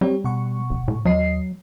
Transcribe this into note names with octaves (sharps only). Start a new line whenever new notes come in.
G3 C4 G4 C#5
B2 F#5 C#6
D1
A2
D#2 F#3 D#5 C7